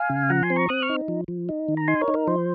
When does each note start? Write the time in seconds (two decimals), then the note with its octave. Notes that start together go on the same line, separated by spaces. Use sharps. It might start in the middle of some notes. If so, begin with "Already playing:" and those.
Already playing: F5 G#5
0.10 C#3
0.29 F3 F#5 A#5
0.43 G#5 C6
0.50 C4
0.56 A#5 C#6
0.69 C4 D#6 F#6
0.82 C#6 F6
0.89 D#4
1.08 F3
1.28 F3
1.49 D#4
1.68 D#3
1.77 A#5
1.88 D#4 G#5 C6
2.01 A#4 C#5
2.08 D#4
2.14 A#4
2.27 F3 C5